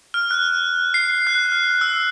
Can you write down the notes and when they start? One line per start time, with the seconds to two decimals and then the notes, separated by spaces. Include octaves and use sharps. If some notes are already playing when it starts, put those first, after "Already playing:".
0.14 F6
0.31 F#6
0.94 C7
1.27 F#6
1.52 F6
1.81 E6